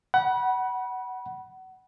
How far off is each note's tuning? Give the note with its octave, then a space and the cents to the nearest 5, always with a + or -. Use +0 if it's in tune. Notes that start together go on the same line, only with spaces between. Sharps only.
F#5 +20 B5 -25